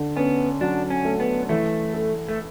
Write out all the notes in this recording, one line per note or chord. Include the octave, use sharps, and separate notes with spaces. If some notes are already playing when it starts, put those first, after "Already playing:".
Already playing: D3
B3 C#4
F#3 D4
C#4
A3
B3
E3 A3
A4
A3